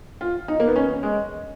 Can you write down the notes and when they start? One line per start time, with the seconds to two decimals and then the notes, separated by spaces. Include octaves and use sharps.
0.21 F4
0.48 D#4
0.60 A#3
0.68 B3
0.76 C#4
1.03 G#3